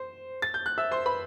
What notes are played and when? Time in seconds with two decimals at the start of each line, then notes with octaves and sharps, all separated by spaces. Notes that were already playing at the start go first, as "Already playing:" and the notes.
Already playing: C5
0.42 A6
0.54 G6
0.66 F#6
0.78 E5 E6
0.91 C5 C6
1.06 B4 B5